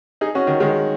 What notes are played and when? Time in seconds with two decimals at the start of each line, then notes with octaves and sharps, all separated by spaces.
0.21 D#4 G#4
0.35 C#4 F#4
0.47 D#3
0.60 D#3 G#3